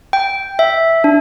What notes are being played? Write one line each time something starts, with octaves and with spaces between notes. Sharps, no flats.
G5
E5
D4